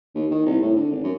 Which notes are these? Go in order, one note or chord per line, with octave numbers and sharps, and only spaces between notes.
D#2
D#3
C2
A2
D3
G#1
F#2